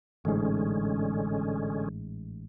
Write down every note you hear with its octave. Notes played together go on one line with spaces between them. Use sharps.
A1 G#2 D3 G#3 C#4